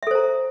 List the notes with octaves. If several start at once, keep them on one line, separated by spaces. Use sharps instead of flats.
A4 C5 E5 A#5